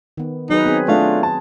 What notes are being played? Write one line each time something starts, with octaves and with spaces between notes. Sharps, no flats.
D#3 B3
F#3 D#4 G#4 B4
B3 C4 G#4
A3 D4 F4
A5